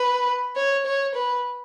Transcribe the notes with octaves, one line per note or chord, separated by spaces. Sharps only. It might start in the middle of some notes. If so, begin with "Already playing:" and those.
Already playing: B4
C#5
C#5
B4